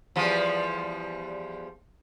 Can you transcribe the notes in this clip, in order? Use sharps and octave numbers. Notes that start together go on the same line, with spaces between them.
E2 F3 G3